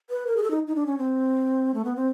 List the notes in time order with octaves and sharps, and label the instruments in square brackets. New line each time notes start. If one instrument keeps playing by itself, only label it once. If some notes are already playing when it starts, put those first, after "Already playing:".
[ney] B4
A#4
G#4
A4
D#4
D#4
D4
C#4
C4
A3
B3
C4